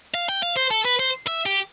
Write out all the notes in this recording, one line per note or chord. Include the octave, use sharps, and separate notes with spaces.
F5
G5
F5
C5
A4
B4
C5
E5
G4